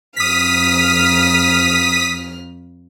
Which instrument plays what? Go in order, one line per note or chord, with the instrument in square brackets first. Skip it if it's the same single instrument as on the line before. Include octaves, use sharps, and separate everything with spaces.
[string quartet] F2 F6 [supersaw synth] D#6 B6